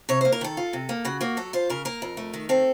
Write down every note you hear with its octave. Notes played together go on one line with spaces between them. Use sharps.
C3 C#5
A#3 C5
A#4
D#3 A4
F4
C3
A#3
C#3 F#4
A#3 F#4
F#3 A4
F4 C5
C#3 A#4
A#3 A#4
F2
A3
D#3
C4 A4